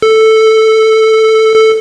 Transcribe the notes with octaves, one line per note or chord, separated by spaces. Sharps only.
A4
A4